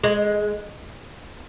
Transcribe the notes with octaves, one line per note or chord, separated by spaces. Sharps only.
G#3